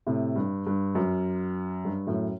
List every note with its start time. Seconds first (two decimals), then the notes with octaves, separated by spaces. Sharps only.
0.07 A2 C3
0.36 G2
0.66 G2
0.95 F#2
1.85 G2
2.07 F#2 A2